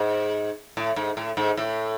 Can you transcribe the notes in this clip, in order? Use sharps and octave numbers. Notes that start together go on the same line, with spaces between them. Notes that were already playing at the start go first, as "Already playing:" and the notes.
Already playing: G#2
A2
G#2
A2
G#2
A2